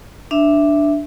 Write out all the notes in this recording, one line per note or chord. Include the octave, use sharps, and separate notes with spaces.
D4 E5